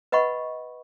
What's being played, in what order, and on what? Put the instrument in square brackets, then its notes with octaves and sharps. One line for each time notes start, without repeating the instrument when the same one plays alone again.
[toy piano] B4 D#5 F#5 B5 C#6